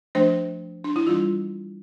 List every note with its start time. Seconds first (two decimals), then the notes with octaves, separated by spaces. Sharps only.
0.15 F3 A3 D4 C5
0.84 D4
0.96 E4
1.07 E3 G3 D4 F4